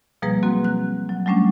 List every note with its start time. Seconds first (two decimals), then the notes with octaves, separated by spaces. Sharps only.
0.22 B2 F3 G3 A#3 G#4 B4
0.43 F#3 A#3 C4 F#4
0.64 F#6
1.09 F#3
1.26 F#3 G3 A3 C#4 D4